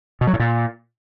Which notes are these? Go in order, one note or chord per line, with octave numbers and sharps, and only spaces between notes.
B2
F#3
A2
A#2